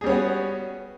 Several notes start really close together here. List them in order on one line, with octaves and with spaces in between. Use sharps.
G#4 G3 C#4 B3 F#4